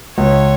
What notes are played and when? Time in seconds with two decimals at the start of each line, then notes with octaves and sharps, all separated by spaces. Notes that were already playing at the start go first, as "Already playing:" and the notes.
0.18 C#2 C#5